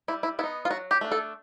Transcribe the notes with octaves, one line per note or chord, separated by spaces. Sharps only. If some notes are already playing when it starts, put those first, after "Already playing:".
G3 E4
E4
B3 D#4 E4
F4
F#3 F#4
G4
A3 D4
A4